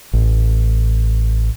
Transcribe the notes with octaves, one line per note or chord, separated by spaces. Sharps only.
A1